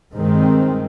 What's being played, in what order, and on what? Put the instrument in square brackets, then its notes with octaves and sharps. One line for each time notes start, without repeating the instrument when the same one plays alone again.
[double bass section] G2 D#3 G#3 C4